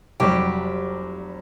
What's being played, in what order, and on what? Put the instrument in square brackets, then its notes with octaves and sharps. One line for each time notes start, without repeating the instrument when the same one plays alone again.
[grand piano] F1 F#3 G3 [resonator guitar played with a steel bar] G4